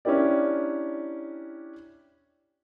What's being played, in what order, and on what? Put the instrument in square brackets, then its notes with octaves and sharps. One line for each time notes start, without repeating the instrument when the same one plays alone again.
[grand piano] C#4 D4 E4 G4 A#4 D5